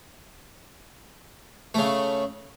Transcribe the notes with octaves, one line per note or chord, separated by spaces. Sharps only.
C#3 A3